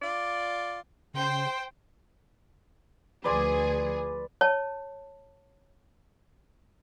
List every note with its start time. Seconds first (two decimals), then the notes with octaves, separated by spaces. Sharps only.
0.01 F4 D5
1.14 C#3 C5 G5 C6
3.24 D2 F3 G#4 B4 D5 C6
4.41 C#5 A5